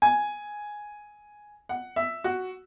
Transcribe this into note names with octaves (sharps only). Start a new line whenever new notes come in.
G#5
F#5
E5
F#4